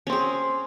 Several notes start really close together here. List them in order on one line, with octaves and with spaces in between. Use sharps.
C#4 C4 G#4